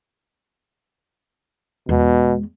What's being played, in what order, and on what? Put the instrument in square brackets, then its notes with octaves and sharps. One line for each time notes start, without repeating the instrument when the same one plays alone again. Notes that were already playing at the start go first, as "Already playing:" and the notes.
[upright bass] E2 G#3 [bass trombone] B2